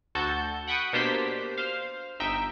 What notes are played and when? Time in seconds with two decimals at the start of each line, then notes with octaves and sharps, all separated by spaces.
0.15 D2 F#4 A4 A5 G6
0.67 F#5 G5 B5 C#6 D#6 F#6
0.93 B2 A#3 D4 G4 C5 B6
1.58 C5 F5
2.20 G1 D#4 E5 G5